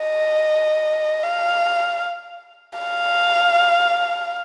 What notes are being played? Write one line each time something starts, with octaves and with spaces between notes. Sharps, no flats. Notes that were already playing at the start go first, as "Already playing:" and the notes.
Already playing: D#5
F5
F5